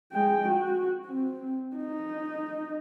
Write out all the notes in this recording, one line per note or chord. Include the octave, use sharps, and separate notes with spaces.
G#3 G5
F#4
C4
D#4